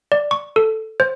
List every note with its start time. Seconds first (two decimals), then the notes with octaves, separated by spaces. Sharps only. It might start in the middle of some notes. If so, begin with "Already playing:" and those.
0.12 D5
0.31 C#6
0.56 A4
1.00 C5